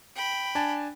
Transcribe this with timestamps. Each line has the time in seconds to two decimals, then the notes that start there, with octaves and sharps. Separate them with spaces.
0.15 G5 B5
0.55 D4 G#5 A5